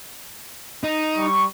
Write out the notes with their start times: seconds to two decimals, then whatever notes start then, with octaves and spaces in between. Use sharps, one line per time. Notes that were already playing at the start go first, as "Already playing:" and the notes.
0.83 D#4
1.17 G3 C#6